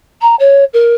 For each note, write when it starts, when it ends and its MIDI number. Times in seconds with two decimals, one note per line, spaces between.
0.21 0.35 82
0.39 0.64 73
0.73 0.95 70